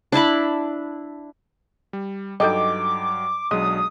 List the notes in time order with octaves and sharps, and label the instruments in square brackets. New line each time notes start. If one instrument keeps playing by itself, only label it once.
[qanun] D4 E4 A5 B5
[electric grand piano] G3
[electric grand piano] G2 F#3 G5 [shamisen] D#4 A4 D#5 [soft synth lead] D6
[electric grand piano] B1 F#3 D4 [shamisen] G#3 [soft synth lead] D#6